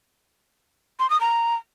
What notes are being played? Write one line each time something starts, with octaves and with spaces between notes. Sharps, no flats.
C6
D#6
A#5